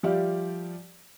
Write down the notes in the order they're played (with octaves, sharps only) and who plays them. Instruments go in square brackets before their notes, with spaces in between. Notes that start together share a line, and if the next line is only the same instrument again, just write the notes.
[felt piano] F3 G3 G4 D5 E5 F5